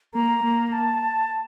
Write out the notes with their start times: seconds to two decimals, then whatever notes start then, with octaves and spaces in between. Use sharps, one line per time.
0.14 A#3 A#5
0.44 A#3
0.72 A5